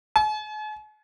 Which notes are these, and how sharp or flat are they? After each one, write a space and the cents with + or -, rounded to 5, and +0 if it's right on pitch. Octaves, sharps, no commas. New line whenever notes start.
G#5 +45